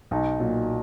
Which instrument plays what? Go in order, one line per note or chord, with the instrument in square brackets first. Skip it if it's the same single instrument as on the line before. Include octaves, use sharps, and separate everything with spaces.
[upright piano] B1 D#4
A#2 F#3